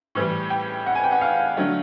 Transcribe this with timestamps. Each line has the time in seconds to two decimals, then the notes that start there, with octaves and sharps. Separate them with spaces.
0.15 A2 E3 G3
0.50 G5
0.86 F#5
0.95 G#5
1.04 G5
1.12 F#5
1.21 F5
1.57 D3 F#3 A3